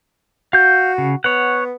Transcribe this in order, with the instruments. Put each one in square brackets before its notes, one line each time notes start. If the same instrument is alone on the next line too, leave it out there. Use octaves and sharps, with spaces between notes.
[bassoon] F#4 [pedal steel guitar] F5 G6
[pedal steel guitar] C#3
[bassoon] B3 [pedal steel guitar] C#5 F#5